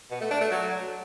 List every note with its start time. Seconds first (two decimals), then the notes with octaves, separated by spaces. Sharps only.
0.11 B2
0.21 A3
0.31 D4
0.41 A3
0.51 F#3